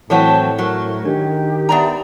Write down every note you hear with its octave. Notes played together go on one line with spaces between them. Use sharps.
A2 E3 F#3 C4 A4 C#5 F#5 A5
F#3 A#4
D#3 D4 G4
B3 D5 E5 G5 A5 A#5